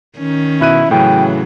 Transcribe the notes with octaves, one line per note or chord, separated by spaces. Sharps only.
D#3 C#4
B2 E4 F#6 D#7
A2 C#3 E3 F#3 G5